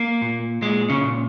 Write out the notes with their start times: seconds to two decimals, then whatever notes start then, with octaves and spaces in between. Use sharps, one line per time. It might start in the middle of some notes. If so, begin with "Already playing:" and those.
Already playing: A#3
0.22 A#2
0.62 A#2 G#3
0.90 C#3 C#4
1.03 A#2